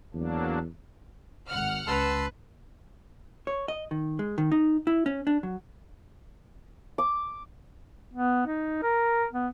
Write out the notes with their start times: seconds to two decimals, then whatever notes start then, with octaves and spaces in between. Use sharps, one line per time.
0.14 E2 F#3 A#3 D4
1.49 G#1 F#5 F6
1.87 C#2 B4 A5 C6 E6
3.47 C#5
3.68 D#5
3.91 D#3
4.19 G#3
4.38 D#3
4.52 D#4
4.87 E4
5.06 C#4
5.27 D4
5.43 F#3
6.98 D6
8.13 B3
8.47 D#4
8.82 A#4
9.33 B3